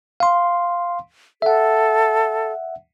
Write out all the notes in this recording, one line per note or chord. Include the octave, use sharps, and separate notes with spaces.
F5 C6
A4 E5 F#5